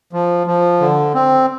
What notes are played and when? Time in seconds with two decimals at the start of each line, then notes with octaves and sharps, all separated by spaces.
0.13 F3
0.47 F3
0.81 D3
1.14 C4